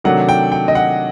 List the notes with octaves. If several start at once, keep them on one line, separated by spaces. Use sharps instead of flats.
C3 D#3 F#3 A3 D4 F#5
G5
G5
D#5
F#5